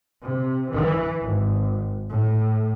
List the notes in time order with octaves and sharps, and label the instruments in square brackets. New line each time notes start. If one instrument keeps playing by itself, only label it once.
[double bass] C3
E3
G#1
A2